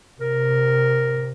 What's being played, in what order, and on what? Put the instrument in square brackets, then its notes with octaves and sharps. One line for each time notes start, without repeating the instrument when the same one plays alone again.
[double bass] C3 [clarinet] A#4